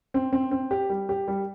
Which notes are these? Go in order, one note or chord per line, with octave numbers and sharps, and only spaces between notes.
C4
C4
C4
G4
G3
G4
G3